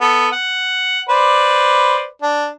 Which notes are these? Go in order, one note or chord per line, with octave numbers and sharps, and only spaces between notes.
B3 A4
F#5
B4 C5 D5
D4